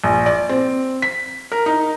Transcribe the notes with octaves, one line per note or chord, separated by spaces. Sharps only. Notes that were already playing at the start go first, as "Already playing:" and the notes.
A#1
D5
C4
B6
A#4
D#4